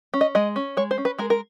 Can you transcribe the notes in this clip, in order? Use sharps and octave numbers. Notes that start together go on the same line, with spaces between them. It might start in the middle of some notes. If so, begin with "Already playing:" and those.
C#4
D#5
G#3 D#5
C#4
G#3 C#5
C5
C#4
B4
G#3 A#4
A#4